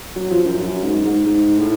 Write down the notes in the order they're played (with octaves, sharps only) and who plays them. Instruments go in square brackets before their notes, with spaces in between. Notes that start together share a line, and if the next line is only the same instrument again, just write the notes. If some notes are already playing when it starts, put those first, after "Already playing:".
[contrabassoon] F#3
F3
F#2
F#2
G#2
G#2
G#2
A2